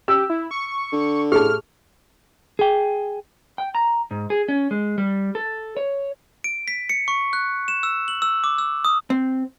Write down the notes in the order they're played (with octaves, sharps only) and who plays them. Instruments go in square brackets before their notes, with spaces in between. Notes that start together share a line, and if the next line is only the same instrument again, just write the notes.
[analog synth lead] G4 [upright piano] E6
[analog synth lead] E4
C#6
[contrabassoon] D3
[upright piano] A2 [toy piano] G4 G#4 A5 [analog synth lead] F6
[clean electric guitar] G#4 G5
[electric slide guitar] G5
A#5
G#2
G#4
C#4
G#3
G3
A4
C#5
[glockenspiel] D7
B6
C#7
C#6
F#6
E7
E6
F#7
E6
D6
E6
D#6
[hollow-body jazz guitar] C4